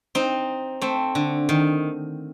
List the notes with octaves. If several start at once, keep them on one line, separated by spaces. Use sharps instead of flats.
C4 D#4
A3 C4
D3
D#3